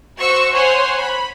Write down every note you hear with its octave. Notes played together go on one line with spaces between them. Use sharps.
F#4 C5 C#6 E6
C5 C#5 F#5 G#5 C6
B5